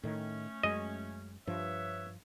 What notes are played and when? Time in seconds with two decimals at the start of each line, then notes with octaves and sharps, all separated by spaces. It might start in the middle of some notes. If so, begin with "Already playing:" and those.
0.03 A2 D#3 A3 C#4
0.63 F#2 G#3 D#5
1.47 G2 F3 B4 C#5 E5